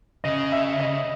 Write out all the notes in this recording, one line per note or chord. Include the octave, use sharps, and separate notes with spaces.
C#3 D#5
E5
D#5